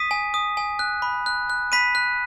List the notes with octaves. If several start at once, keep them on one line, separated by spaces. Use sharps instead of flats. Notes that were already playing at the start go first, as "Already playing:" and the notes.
Already playing: D#6 B6 D#7
G#5
D#6
G#5
F#6
B5
F#6
F#6
B5 B6 D#7
F#6